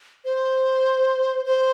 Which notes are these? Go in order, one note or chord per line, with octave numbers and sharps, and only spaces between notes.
C5
C5